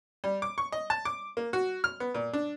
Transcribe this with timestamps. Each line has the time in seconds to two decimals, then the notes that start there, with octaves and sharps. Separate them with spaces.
0.24 G3
0.42 D6
0.58 C#6
0.72 D#5
0.90 A5
1.05 D6
1.37 A#3
1.53 F#4
1.84 F6
2.00 B3
2.14 A#2
2.33 D4